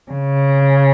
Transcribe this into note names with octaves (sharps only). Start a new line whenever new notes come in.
C#3